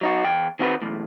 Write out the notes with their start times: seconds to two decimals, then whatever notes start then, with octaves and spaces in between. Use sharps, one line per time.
0.01 F#3 D#4 F#4
0.24 E2 G5
0.59 D#3 C4 F#4 G#4 B4
0.82 B1 E2 A2